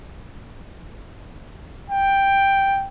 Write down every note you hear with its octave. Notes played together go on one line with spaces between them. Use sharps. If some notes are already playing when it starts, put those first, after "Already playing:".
G5